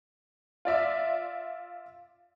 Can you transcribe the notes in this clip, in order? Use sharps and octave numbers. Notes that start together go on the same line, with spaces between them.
F4 D5 E5